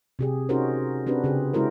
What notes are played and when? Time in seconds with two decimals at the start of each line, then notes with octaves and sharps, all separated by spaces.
0.19 C3 G4 G#4
0.49 C#4 D#4 F#4 G#4 A#4 C5
1.06 C4 D4 F#4 G4 B4
1.24 C#3 G4 G#4
1.54 G#3 C#4 E4 F#4 A#4 C5